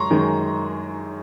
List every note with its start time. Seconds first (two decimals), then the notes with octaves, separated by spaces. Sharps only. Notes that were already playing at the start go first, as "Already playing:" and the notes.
Already playing: F#2 G#3 A#5 C6 C#6
0.10 F#2 D#3 G#3